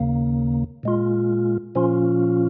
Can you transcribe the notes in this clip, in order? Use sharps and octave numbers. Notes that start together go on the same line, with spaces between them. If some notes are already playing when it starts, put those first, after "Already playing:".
Already playing: D#2 C#3 A#3
A#2 G#3 F4
A#2 F3 C#4 F4